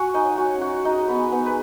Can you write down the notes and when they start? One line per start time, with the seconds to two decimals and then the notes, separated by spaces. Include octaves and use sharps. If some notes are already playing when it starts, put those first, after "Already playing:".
Already playing: F#4 F#5 G#5
0.14 D#4 D#5
0.22 C#5
0.38 F#4 F#5
0.53 C#4
0.61 F#4 F#5
0.85 D#4 G#4 D#5
1.08 B3 B4
1.17 G#5
1.32 B3 B4
1.46 G#4 B4